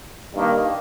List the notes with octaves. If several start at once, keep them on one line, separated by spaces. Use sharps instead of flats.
G2 D#3 A#3